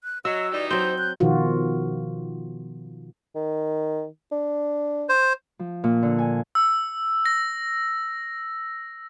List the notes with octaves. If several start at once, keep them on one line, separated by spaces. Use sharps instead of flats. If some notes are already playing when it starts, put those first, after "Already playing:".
F#6
F#3 F#4 D#5 E6
E3 G3 D#4 D5
F#3 C4 C5 G6
F#6
B2 D#3 F3 F4 F#4
D#3
D4
C5
F3
A#2
D3
G#5
E6
A#6